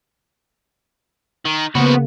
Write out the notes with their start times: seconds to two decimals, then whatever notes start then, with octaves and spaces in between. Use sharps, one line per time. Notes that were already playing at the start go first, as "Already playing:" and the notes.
1.45 D#3
1.75 C#3 F3 A#3 B3 F#4